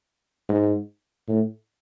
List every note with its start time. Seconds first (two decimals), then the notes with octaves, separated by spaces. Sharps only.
0.49 G#2
1.28 A2